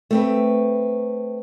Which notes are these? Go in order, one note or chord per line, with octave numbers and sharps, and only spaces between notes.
A3 C4 B4